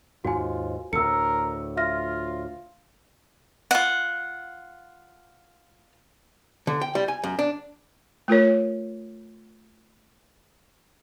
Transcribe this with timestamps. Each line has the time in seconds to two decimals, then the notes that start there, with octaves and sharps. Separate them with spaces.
0.25 D#2 G#2 F4 F#4 G#5
0.93 D2 A2 A#4 E6 C#7
1.77 F4 E5 F6 A#6
3.71 F4 F#5
6.67 D3
6.81 G5
6.95 G3
7.08 G#5
7.24 F#2
7.39 D4
8.28 A3 F4 A#4 C#5